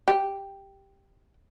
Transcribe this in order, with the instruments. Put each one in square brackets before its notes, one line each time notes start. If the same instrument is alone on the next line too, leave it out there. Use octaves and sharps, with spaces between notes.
[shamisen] G4